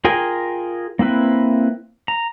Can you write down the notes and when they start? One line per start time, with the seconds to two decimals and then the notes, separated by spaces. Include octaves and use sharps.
0.05 F4 G#4 A#4 G5 G#5
0.99 A#3 C4 E4 B4
2.08 A#5